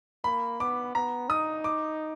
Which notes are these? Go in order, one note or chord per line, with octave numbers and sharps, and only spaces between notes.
A#3 B5
B3 D6
B3 A#5
D#4 D#6
D6